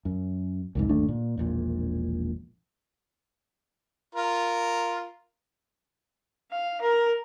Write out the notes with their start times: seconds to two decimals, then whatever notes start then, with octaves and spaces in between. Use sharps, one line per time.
0.05 F#2
0.75 C2 F2 G#2
0.89 G1 D#2 A3 D4
1.08 A#2
1.38 E1 A#1 A#2
4.15 F4 A#4
6.51 F5
6.81 A#4